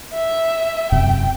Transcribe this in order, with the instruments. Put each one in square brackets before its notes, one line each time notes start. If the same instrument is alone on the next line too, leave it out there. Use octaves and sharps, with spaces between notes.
[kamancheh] E5
[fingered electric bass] E1 F#2 C3 [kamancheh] G5